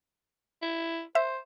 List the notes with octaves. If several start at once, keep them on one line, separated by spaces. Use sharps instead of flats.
E4
C5 E5